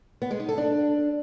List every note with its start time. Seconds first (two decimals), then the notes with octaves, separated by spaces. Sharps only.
0.22 B3
0.31 G#3
0.40 D#4
0.49 A4
0.58 D4